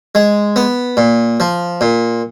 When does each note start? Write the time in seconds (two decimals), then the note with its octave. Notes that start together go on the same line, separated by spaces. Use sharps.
0.15 G#3
0.56 B3
0.97 A#2
1.40 F3
1.81 A#2